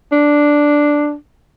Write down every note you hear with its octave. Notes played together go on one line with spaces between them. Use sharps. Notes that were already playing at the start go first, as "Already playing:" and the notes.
D4